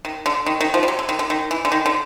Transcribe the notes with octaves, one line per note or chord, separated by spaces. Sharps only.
D#3
D3
D#3
D#3
F3
G3
F#3
D3
D#3
D3
D#3
E3
D3
D#3
D3